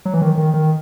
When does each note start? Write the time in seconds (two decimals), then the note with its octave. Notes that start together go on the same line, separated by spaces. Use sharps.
0.05 F#3
0.14 E3
0.22 D#3
0.38 D#3
0.54 D#3